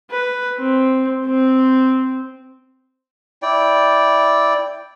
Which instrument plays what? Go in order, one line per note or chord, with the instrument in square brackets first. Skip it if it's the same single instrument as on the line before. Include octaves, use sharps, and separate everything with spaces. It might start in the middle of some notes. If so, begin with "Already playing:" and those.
[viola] B4
C4
C4
[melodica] E4 D5 G5